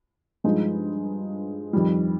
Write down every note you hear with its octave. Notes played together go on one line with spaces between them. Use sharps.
G2 F3 G#3 D#4
F2 D#3 G3